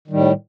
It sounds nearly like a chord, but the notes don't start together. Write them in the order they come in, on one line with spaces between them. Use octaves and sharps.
D#3 G3 A2